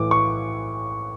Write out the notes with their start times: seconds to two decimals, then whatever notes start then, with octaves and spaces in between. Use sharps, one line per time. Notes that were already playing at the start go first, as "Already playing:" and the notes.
Already playing: A2 E3 D6
0.11 C#6